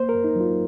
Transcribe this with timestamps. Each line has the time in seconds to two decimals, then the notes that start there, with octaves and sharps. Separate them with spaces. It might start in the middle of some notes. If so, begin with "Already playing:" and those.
Already playing: A#3 C5
0.09 A#4
0.15 F#2
0.24 D#4
0.36 F#3 F4